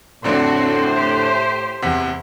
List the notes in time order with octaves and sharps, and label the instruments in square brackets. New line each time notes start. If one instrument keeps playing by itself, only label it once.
[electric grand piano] F2 D3 D4 [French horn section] A2 [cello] C4 F#4 [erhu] C5
[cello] G4
[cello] E2 E3 [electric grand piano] C3 F#5 B6